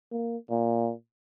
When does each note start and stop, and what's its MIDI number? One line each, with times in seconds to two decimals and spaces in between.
0.12 0.37 58
0.50 0.92 46